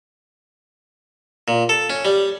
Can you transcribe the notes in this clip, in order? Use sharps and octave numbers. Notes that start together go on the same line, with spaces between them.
A#2
A4
C#4
G3